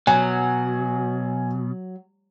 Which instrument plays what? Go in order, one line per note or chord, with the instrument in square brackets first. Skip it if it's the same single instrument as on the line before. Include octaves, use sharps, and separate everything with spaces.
[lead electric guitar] B2 [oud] F#3 [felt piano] G#5